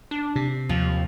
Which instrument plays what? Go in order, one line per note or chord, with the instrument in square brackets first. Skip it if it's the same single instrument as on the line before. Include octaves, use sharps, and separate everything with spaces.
[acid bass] D4
[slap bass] C3
[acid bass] D#2 [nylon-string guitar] F3